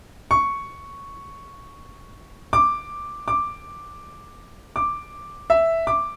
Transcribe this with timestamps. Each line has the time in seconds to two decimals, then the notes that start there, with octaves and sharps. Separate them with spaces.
0.31 C#6
2.53 D6
3.28 D6
4.76 D6
5.50 E5
5.87 D6